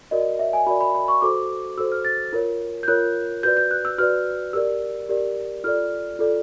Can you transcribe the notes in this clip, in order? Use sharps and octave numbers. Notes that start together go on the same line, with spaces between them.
F#4 A#4 D5 D#5
E5
G#5
F#4 A#4 D5 B5
B5
B5
C#6
F#4 A4 C5 D6
F#4 A4 C5 E6
F6
A6
F4 A#4 C#5
G6
F4 A#4 C#5 F#6
F#4 B4 D5 G6
G6
F#6
E6
F#4 B4 D5 F6
G4 A#4 D5 E6
G4 A#4 D5
F4 A4 D5 F6
F4 A4 D5